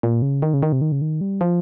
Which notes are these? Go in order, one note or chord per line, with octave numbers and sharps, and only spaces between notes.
A#2
C#3
D#3
C#3
D#3
C3
D#3
C#3
D#3
G3
F3